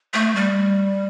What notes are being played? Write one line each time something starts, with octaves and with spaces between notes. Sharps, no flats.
A3
G3